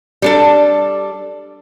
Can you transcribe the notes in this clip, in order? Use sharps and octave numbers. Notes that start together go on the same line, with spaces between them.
G3 D4 A4